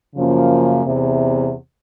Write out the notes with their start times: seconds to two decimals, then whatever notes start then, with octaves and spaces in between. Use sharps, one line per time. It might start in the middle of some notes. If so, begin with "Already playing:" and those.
0.16 F#2 C#3 F3 A#3 C#4
0.84 E2 C3